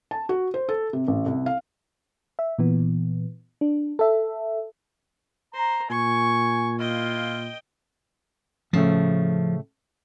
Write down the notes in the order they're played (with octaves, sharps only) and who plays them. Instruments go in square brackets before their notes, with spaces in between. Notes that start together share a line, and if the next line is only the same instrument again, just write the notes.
[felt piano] A5
F#4
C5
A4
C3
A1
C2
F5
[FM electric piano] E5
A#2 E3 B3
D4
A4 E5
[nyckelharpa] C5 [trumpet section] A#5
[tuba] A#2 [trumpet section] G#5 [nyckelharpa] C#6
[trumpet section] E4 F4 F5 [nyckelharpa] D#5 G5
[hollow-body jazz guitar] A2 C#3 A3 [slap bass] F3